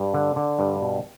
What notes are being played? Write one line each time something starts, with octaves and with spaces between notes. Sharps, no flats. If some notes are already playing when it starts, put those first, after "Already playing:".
Already playing: G2
D3
D3
G2
B2